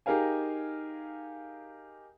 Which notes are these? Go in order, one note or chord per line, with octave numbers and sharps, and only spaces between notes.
D#4 G4 G#4 A#4 F5 G#5